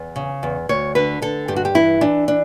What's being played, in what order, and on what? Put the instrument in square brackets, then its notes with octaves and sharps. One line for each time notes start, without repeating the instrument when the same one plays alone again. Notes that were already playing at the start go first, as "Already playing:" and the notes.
Already playing: [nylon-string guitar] E2
C#3
E2
D2 C#5
D3 B4
D3 A4
G2 G4
F#4
G4
E3 E4
E3 D4
D4